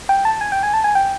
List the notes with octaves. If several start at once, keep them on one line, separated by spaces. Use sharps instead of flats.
G5
A5
G#5
G5
G#5
A5
G#5
G5